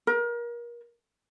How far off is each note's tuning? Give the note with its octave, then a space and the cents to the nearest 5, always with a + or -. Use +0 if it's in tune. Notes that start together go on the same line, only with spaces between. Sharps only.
A#4 +30